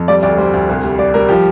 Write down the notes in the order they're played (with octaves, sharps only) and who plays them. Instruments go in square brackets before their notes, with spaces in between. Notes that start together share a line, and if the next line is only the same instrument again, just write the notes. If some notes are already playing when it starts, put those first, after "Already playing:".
Already playing: [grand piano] F2
G3 D5
D2 D5
G3 C5
D2
C2
G3
G3 D5
G3 A#4
F3 G4